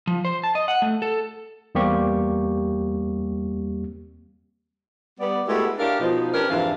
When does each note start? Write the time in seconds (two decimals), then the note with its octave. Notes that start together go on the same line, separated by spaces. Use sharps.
0.07 F3
0.25 C5
0.44 A5
0.55 D#5
0.68 F#5
0.82 A3
1.02 A4
1.75 E2 G3 A#3 C4 G4 C#6
5.20 G3 B3 D5
5.47 G#3 A3 B3 E4 F#4 G4
5.79 D4 E4 G4 A#4 C#5 F5
6.00 B2 F3 D#4
6.34 C#4 D4 G4 A#4 B4
6.50 F2 G#2 C3 E3 D4 F5